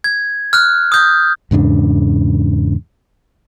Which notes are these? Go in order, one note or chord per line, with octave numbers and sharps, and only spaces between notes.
G#6
F6 F#6
D#6 G6
E2 G#2 C#3 D4